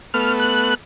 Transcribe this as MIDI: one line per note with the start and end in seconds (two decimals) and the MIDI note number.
0.14 0.74 57
0.14 0.74 59
0.14 0.34 89
0.40 0.75 90